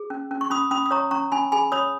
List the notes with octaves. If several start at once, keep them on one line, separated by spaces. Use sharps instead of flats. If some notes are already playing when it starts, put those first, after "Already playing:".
Already playing: G#4
C#4
C#4
C#6
C#4 B5 D#6
C#4 B5 D#6
D#6
C#5 A#5 C#6
C#4 A#5 C#6
C#4 G#5 B5
G#4 G#5 B5
C#5 B5 D#6